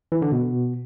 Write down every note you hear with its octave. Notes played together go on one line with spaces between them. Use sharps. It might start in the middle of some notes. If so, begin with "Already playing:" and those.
E3
D3
B2